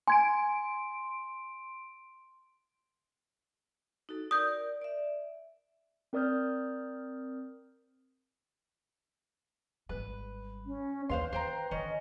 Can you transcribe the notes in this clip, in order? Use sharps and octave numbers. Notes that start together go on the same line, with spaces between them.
G#5 C6 G#6 D7
D#4 F#4 A4
A#4 D5 D#6 G6
D5 E5
C4 A#4 D5 D#6 F6 G6
G#1 G3 B4
C#4
D#2 D4 B4 C5 F5 C6
D#3 C5 G5 A#5
D3 D#3 C#4 D#5